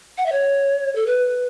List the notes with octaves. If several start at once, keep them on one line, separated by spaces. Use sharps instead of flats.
F#5
E5
C#5
A4
B4